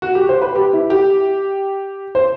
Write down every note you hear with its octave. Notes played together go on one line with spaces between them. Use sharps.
F#4
G4
C5
B4
G4
E4
G4
C5